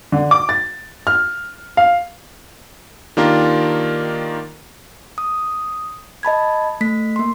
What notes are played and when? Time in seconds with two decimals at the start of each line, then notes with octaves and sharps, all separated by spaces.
0.12 D3
0.31 D6
0.49 A6
1.07 F6
1.77 F5
3.17 D#3 A#3 D4 F4 G4 A#4
5.18 D#6
6.23 D#5 A5 B5 G#6
6.81 A3 B6
7.16 A#3 C6